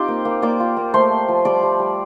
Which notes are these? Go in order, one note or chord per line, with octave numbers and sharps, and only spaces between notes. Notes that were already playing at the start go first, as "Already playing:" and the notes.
Already playing: C4 D#4 F4 G4 C5 G5
A#3
A#3
A#3 D5 D6
F4
A#3
A3 C5 C6
A3
F3
G3 D5 D6
G3
G3